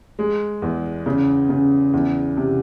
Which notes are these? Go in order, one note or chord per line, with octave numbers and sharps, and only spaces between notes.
G#3
E2
C#3
C#3
E2
C3